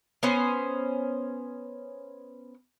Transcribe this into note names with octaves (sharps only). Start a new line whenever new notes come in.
B3 C#4 C5